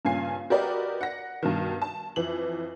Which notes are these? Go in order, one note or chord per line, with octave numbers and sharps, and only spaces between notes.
G2 A#2 C#3 G#5 C7
F#4 G4 A#4 B4 D5 D#5
F#5 A#6
G2 B2 D#3
A5
F2 E3 F#7